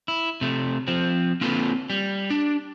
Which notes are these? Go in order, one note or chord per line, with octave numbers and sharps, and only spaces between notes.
E4
C3 A3
F3 C4
A#3 C4 F4 A4 B4
G3
D4